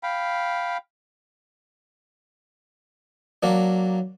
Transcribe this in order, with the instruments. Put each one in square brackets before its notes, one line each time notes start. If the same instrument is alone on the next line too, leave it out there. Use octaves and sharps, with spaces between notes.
[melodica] F5 G5 B5
[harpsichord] F#3 A#3 D4